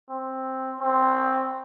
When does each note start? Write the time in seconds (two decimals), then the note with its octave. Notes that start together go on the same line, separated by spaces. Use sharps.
0.10 C4
0.81 C4